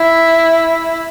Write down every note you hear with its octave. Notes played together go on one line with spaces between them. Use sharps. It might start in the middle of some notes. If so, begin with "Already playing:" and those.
Already playing: E4